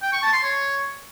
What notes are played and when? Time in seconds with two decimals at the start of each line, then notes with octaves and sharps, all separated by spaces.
0.02 G5
0.12 C#6
0.23 A5
0.33 C6
0.43 C#5